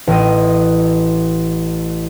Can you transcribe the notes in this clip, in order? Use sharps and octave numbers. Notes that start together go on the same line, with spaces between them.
A1 D#5